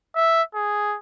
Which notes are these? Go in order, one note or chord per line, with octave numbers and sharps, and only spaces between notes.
E5
G#4